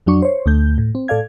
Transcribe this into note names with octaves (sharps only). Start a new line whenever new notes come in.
F2 F#3 D4 C#6
C5 C#5
D2 A3 G6
A2
C4
A2 A4 D5 F5 G#6